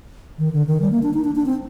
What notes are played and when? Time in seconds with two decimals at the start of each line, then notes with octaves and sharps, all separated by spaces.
0.39 D#3
0.52 D3
0.67 D#3
0.81 G3
0.92 A#3
1.03 D4
1.13 D#4
1.24 D4
1.35 D4
1.46 C4